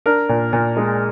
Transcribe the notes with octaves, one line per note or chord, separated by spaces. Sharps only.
D4 A#4
A#2
A#2
G#3